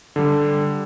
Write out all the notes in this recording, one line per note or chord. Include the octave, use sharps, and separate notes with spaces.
D3 G3